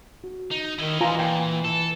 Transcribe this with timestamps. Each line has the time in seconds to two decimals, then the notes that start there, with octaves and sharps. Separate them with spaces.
0.24 F#4
0.51 D#4
0.79 D#3 E4 D#5
1.01 E3 F4 G#5 A#5
1.19 A#2 G5
1.64 E3 A4